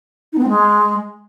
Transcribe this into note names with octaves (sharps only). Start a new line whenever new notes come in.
D#4
B3
C4
G#3